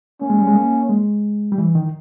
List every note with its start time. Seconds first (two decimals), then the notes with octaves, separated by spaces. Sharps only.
0.21 A#3 C#4
0.30 G#3
0.39 G3
0.47 G#3
0.55 A#3
0.89 G#3
1.52 G3
1.58 E3
1.75 D#3